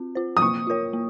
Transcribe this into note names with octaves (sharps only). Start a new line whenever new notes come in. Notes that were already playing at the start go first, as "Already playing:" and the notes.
Already playing: C4 F4
F4 C5
D#6
A#3 C#6
F4 A#4 C#5
A#3